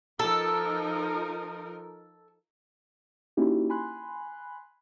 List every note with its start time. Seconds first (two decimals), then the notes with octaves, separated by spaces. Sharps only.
0.19 F3 D#4 A4 A#4
3.37 A#3 C#4 D#4 E4 F#4 G4
3.69 G#5 B5 C6 F#6